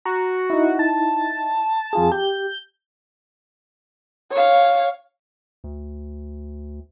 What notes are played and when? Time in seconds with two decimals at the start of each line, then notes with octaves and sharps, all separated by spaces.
0.05 F#4 A#5
0.50 D#4 E4
0.79 A5
1.93 F2 F4 G#4
2.12 G4 G6
4.32 C#5 F5
5.64 D2